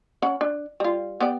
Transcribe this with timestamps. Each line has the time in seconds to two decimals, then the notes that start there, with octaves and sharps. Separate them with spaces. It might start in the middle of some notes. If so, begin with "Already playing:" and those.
0.22 C#4 F#5 B5
0.41 D4
0.80 G3 F4
1.20 B3 G4 D5